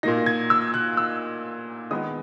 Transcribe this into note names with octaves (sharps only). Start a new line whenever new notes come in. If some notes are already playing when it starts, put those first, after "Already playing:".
A#2 A#3 D#4 A#6
G#6
E6
F#6
E6
D#3 G#3 B3 D#4 D#6